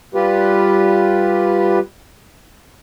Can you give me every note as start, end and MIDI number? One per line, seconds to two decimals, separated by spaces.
0.14 1.79 55
0.14 1.79 65
0.14 1.79 67
0.14 1.79 71